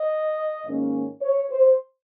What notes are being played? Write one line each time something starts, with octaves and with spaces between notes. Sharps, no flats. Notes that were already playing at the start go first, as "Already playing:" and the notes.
Already playing: D#5
G#2 D#3 A#3 C#4
C#5
C5